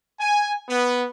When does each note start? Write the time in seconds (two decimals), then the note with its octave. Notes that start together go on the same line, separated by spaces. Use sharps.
0.20 G#5
0.69 B3